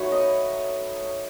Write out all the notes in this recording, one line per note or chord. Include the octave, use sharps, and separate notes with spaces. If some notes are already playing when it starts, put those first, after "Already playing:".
Already playing: F#3 A3 D#4 B4 C#5
D#5